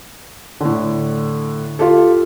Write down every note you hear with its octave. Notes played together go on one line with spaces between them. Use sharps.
A2 D3
F4 G4 A4